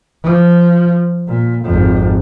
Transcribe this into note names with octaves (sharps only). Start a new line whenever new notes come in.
F3
A#2
G#1 F2